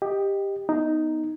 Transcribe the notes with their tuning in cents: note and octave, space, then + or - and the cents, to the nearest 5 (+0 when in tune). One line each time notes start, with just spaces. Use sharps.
G4 +10 D#5 -5
B3 -5 D#4 +0